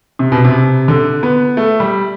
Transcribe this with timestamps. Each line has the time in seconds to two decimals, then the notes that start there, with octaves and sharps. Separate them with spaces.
0.19 C3
0.32 B2
0.45 C3
0.88 D3
1.23 B3
1.57 A3
1.80 G3